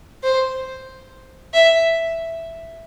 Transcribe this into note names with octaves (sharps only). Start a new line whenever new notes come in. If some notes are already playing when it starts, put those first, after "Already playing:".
C5
E5